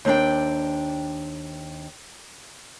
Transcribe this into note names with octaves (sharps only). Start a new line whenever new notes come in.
D#2 C4 D4 G5